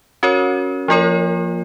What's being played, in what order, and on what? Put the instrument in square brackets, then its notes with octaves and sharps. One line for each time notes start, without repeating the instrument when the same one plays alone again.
[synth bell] C#4 F#4 A#4 C#5
F3 A#3 F4 A#4 C#5